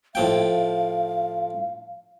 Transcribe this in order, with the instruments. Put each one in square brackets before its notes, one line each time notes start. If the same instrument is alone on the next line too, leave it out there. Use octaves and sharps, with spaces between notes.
[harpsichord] A2 F3 G5 [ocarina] F5